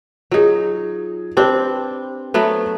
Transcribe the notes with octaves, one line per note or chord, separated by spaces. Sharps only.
F#3 D#4 F4 G#4
C4 D4 G4 B4 C5
F#3 A3 B3